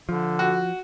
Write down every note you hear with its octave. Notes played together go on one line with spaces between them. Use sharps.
D3 F3
F#4